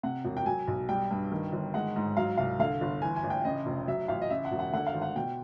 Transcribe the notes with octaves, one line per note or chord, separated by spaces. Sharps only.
C3 F#5
E1
G5
F#3 G#5
B1
G3 G5
G2
D#3
G1
G#3 F#5
G#2
F#3 F5
C2 F5
D3 F5
G1
E3 G#5
G#5
A1
G5
C#3 D#5
F1
F#3 E5
A1 F5
D#5
C#3 E5
F#5
E1
F#5
D3 F#5
F5
G#1
F#5
B2 G5